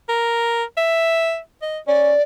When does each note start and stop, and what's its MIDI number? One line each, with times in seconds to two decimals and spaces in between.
0.09 0.63 70
0.77 1.38 76
1.62 1.78 75
1.87 2.12 61
1.87 2.22 74